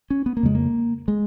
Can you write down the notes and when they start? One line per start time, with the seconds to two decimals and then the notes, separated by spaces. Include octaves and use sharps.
0.10 C#4
0.26 B3
0.37 A#3
0.43 F2 C#3 G#3
0.55 A#3
1.08 G#3